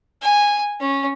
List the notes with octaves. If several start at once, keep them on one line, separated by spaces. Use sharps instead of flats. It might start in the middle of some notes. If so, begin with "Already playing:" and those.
G#5
C#4